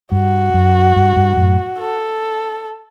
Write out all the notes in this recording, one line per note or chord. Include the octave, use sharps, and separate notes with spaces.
G2 F#4
F#2
G2
G2
F#2 A2
A4